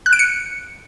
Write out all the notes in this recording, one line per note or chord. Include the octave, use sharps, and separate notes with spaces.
F#6
D7
C#7